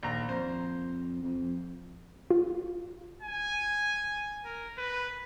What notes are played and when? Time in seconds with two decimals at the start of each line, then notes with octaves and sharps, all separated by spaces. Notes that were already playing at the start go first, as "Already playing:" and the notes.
0.03 A#1 D#2 A#5
0.29 F2 C5
1.22 F2
2.30 F4
3.22 G#5
4.45 A#4
4.78 B4